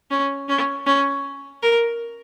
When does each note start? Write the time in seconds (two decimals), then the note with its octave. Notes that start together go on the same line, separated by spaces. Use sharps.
0.10 C#4
0.48 C#4
0.86 C#4
1.62 A#4